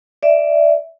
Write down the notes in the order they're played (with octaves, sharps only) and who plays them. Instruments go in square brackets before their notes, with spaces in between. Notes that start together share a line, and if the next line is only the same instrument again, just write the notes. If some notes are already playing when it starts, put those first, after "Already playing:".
[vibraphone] D5 E5